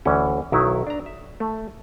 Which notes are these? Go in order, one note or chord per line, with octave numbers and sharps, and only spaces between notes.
D2 E3 C#4
B1 D#3 F#3 D#4 E4
D4 A#5
E5
A3